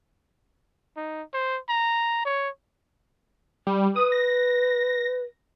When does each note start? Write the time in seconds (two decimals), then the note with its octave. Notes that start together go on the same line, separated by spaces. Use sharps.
0.97 D#4
1.34 C5
1.69 A#5
2.25 C#5
3.67 G3
3.96 B4 D#6
4.12 A#6